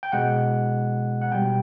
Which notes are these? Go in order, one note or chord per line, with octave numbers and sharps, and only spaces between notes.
G5
B2 G#3 F#5
F#5
B2 G3 G5